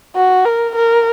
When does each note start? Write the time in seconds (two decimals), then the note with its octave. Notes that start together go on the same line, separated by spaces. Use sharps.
0.16 F#4
0.45 A#4
0.76 A#4